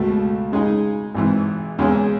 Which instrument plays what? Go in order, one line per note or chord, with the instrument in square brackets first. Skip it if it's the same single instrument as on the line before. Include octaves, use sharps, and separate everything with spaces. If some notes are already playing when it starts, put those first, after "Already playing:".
Already playing: [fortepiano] C#2 B2 A3
C#3 G#3 D#4 G#4
G#1 G#2 E3
E2 C#3 G#3 C#4 G#4